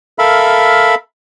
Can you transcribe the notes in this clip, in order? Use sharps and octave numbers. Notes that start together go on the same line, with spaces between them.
A4 A#4 E5 F5 B5